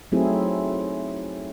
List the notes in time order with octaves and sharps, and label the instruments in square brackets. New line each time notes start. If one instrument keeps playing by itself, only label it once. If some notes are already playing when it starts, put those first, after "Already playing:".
[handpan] F#3 A3 C4 D#4 E4 G#4